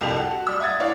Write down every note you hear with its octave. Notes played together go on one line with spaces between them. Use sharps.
C2 F2 G4 F7
A4 F#5
F#4
G3 E6
E5 F#5 D#6 G#6 A6
E4 C#5 D5 F5 F#5